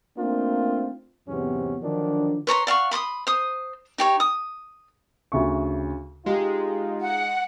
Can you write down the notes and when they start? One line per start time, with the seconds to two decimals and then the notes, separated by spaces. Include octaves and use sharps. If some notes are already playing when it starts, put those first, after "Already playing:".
0.18 A3 A#3 C4 D4 D#4 F4
1.27 E2 G#2 C3 F#3 B3 C#4
1.82 D3 D#3 F3 F#3 D4
2.47 B4 C#5 A#5 C6
2.67 D5 F5 F#5 C#6
2.91 B5 C6 D6 D#6
3.27 C5 D#6
3.98 D#4 G4 C#5
4.20 D#6
5.32 D2 C#3 C#6
6.26 G#3 D#4 F4 G4
7.01 F#5